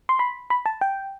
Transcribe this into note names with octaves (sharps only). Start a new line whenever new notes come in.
C6
B5
B5
A5
G5